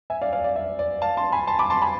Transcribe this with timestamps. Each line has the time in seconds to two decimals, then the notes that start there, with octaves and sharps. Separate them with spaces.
0.10 E5 G#5
0.21 D5 F5
0.33 D5 F5
0.44 D5
0.56 E5
0.79 D5
1.02 F5 A5
1.17 A5 C6
1.32 G#5 B5
1.47 A5 C6
1.59 B5 D6
1.70 A5 C6
1.82 G#5 B5